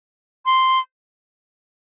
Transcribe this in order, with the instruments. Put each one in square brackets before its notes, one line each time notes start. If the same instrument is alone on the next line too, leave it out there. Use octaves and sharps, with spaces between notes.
[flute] C6